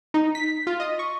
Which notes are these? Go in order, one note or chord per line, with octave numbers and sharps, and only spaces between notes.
D#4
B6
F4
D#5
C#6